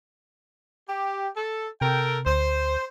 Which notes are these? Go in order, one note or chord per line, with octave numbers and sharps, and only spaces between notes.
G4
A4
C3 A4 A#4 G5
D2 C5